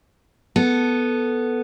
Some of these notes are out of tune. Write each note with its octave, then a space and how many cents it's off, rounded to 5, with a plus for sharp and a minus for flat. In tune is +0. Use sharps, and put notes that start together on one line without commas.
B3 +0 A4 +0